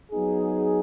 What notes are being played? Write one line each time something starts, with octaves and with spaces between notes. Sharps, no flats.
F#3 B3 D#4 G#4